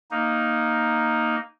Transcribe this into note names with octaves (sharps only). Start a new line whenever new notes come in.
A#3 D#4